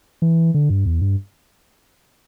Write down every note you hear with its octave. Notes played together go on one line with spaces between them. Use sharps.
E3
D3
G2
E2
G2